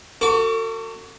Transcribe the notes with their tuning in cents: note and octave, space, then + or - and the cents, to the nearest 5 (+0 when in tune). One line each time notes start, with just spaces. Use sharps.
F#4 +0 A4 +45 D6 -35